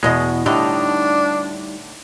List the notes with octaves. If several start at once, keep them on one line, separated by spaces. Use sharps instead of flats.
E2 B2 G#3 D#5
A2 D3 G3 D4 D#4